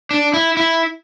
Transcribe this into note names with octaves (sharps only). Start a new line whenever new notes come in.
D4
E4
E4